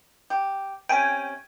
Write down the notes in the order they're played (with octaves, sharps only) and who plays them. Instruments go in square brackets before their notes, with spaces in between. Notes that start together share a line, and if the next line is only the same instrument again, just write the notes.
[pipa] G4
[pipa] C3 C#4 [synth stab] G5 G#5